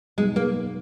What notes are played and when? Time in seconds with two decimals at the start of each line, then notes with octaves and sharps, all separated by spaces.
0.18 E2 B2 F#3 G#3 B3 D#4
0.36 A#3